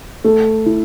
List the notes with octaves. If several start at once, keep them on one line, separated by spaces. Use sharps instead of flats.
A3
E4